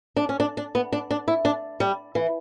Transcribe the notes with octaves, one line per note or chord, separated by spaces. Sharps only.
D4
C#4
D4
D4
B3
D4
D4
E4
D4
G3
E3